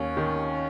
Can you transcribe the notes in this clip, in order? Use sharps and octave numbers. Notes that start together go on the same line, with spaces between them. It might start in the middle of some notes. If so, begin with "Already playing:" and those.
Already playing: D#2 C#4
D#3